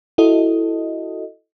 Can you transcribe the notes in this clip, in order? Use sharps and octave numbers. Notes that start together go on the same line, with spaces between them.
E4 F#4 A4 D#5